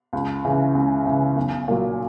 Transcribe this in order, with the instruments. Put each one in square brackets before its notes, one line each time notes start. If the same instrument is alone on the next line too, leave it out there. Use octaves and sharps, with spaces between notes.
[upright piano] C#2
C#3 E3
C#2
C#3 E3
B1
A#2 F#3